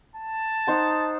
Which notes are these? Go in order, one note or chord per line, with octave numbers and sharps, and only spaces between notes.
A5
D#4 C5 F#5